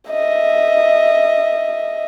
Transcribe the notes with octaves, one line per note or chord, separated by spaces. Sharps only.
D#5 E5